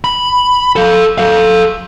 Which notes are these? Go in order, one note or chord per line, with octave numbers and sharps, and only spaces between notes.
B5
A4 F5
A4 F5